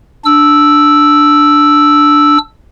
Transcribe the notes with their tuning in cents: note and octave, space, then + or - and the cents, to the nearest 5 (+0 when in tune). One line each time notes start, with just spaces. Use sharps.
D4 +0 E6 +0